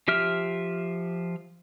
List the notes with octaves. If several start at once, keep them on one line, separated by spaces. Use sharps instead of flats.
F3 G4 E5 F6